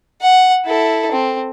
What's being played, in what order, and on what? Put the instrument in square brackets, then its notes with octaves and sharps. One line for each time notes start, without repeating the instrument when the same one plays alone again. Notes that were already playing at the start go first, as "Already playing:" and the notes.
[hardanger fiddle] F#5
E4 A4
C4